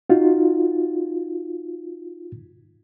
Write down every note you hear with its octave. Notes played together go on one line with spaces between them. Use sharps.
D#4 F4 F#4